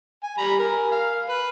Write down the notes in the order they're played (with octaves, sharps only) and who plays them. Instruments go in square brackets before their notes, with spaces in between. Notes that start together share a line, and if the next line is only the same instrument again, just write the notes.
[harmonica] G#5
G3 A#5 B5
A#4 G#5
F5
B4